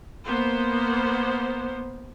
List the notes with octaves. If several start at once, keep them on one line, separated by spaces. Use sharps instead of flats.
A#3 B3 C5